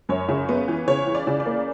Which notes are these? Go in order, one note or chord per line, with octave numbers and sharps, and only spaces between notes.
F#2 C#5
C#3
B3
E3
C#3 C#5
E3
D5
C#3
D5
A#3